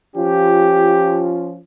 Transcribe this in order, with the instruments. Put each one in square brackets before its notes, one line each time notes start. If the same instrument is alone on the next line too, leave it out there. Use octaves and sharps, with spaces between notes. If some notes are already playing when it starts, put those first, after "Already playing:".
[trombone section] F3 C#4 F4 [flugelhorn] G4